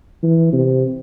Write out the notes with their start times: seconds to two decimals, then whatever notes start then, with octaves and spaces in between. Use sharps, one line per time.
0.23 E3
0.53 C3